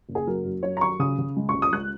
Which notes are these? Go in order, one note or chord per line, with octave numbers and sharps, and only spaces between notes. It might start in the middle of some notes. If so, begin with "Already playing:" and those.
F#1
G#4
F#3 A#4
F#2
F#3 C#5
A#5
F#3 C#6
C#3 D#6
C#3
G#3
C#6
C#2
D#6
G#3 F#6